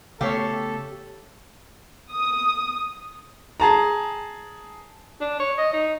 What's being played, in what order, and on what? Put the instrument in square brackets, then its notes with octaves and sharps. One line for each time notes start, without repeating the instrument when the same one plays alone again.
[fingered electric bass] C#3 A3 B3 [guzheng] G4 E5 [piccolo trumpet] A4 [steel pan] C#5 F5
[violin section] D#6
[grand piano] G#4 A5 A#5
[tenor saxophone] D4
C#5
D#5
D#4